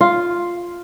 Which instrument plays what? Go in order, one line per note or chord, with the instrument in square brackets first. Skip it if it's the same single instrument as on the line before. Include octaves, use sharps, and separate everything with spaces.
[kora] F4